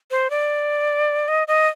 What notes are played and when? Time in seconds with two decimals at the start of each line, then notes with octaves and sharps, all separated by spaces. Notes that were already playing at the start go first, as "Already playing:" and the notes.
0.11 C5
0.30 D5
1.28 D#5
1.48 D#5